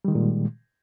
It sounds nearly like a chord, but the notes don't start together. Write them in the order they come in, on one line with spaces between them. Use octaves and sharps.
G3 D#3 G#3 A#2